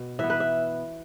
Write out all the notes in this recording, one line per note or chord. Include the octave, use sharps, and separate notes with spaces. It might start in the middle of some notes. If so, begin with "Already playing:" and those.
Already playing: B2
E3 B3 E5
B4
E5